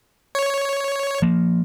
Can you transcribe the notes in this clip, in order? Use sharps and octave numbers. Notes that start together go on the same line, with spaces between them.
C#5
F3 A#3